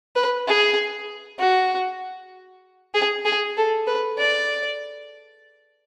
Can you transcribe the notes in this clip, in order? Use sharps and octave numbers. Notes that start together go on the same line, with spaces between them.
B4
G#4
F#4
G#4
G#4
A4
B4
D5